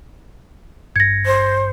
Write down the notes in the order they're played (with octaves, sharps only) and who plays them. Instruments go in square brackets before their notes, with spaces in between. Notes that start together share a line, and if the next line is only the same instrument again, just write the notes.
[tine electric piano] G#1 G2 C#7 [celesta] G#6 A#6
[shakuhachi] C5